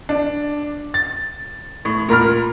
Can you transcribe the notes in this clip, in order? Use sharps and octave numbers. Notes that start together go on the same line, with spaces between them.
D4
A6
A2
A#2 A#4 B5 F6